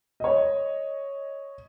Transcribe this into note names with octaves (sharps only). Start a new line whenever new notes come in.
C#5 D#5